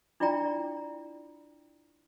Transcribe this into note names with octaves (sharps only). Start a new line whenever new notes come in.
D4 E4 F4 D5 G5 A#5